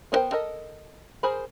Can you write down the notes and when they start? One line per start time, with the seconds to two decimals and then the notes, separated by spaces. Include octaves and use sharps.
0.12 B3 D4 A#4 C5 G5
0.32 A4 A#4 D#5
1.23 G#4 A#4 C5 B5